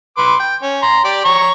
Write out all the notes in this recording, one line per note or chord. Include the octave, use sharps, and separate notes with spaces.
B4 C6 D6
G5
C#4
A#5 C6
G4 D5
C#5 A#5 C#6